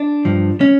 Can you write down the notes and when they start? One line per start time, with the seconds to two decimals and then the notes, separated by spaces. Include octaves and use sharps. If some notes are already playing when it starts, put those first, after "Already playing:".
Already playing: D4
0.25 G2 F3
0.61 C#4